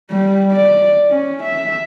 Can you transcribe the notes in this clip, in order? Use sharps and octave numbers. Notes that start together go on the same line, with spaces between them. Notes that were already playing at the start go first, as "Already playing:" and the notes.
G3
D5
C#4
E5